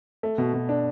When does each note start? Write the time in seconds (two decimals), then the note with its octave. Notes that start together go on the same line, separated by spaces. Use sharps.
0.23 A3
0.38 B2
0.54 B2
0.69 D4